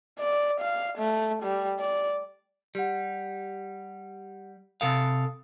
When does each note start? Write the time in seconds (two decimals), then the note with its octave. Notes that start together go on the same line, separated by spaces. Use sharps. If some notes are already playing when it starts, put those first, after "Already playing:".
0.19 D5
0.60 F5
0.98 A3
1.43 G3
1.79 D5
2.75 G3 G4 F#5
4.81 C3 A4 F5 D#6 E6